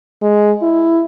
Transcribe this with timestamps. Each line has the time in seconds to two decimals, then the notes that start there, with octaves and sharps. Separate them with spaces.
0.22 G#3
0.62 E4